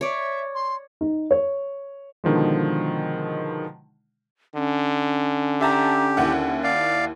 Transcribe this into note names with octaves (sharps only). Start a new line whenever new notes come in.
C#5 D5 E5
C6
D#4
C#5
B2 D3 D#3 F3 G#3
D3 C#4
G4 E5 A5 A#5
D#2 E4 F#5
D5 F5